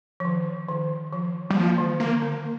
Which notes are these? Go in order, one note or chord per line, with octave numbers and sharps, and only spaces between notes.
F3
D#3
D#3
F3
G3
F3 A#3
D#3
D3 A#3
D3